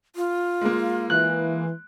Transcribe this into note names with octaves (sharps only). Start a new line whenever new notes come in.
F4
G#3 A#3
E3 F#6